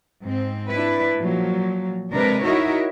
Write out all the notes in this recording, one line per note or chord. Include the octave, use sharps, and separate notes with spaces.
G#2 C4
D4 E4 B4
A#2 F3 F#3
C3 G#3 D4 A#4 B4
D#4 E4 F#4 A#4 C#5 E5